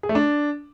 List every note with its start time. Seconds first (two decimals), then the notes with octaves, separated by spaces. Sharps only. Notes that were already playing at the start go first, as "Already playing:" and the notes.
0.03 G#4
0.09 A3
0.15 D4